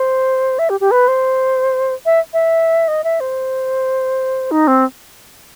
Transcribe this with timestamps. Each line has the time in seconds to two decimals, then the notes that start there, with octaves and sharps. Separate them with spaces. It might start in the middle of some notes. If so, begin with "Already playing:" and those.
Already playing: C5
0.59 E5
0.69 G4
0.80 G4
0.91 B4
1.08 C5
2.06 E5
2.33 E5
2.88 D#5
3.04 E5
3.20 C5
4.51 D#4
4.67 C4